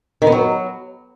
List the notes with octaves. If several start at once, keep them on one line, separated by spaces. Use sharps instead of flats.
D#3
B3
F#3